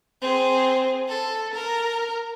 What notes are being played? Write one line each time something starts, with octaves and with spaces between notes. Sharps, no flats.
C4 G#4
A4
A#4